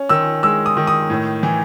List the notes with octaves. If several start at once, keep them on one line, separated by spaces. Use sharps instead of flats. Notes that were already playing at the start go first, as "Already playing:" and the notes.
Already playing: C#4
D#3 E6
G#3 E6
D#6
D#3
D#6
A2
E3